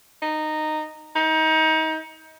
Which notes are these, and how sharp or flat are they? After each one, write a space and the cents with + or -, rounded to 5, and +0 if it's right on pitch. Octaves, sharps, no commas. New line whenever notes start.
D#4 -10
D#4 +30